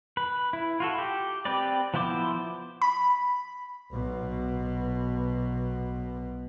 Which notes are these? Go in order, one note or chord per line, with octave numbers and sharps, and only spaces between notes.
B4
E4
F4 F#4 A4
G4
C4 G4 B4 D5
F3 B3 E4 C5 D6
B5
B1 B2